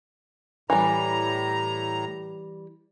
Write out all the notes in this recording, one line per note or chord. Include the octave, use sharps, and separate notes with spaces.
A2 E3 G3 A#5